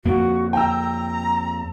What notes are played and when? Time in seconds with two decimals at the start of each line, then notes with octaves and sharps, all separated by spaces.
0.05 F2 A#3 F#4
0.53 G5 A#5 E6